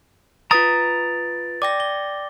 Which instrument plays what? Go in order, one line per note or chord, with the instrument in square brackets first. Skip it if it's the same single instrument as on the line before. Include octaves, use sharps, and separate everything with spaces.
[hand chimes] F4 B4 D7 [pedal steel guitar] A#5 D#6 [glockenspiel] A6
[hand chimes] D5 G5 A#6 [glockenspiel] D6
[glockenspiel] G7